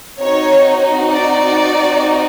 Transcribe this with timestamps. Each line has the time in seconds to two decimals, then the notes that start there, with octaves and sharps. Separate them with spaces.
0.20 C4 D#4 F#4 C#5
1.11 D5